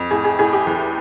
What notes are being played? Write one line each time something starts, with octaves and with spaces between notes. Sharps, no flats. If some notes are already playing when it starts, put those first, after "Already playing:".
Already playing: F2
A2 G#4
G#4
A2 G#4
G4
E2